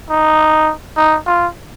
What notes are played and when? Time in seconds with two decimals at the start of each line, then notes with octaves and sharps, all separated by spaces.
0.10 D#4
0.97 D#4
1.26 F4